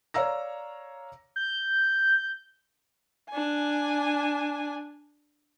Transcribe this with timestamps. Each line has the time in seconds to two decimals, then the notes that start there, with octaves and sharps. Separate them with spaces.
0.14 C#5 D5 F5 A#5 E6 A#6
1.36 G6
3.30 D4 G#5